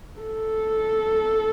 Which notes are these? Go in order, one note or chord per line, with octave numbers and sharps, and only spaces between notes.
A4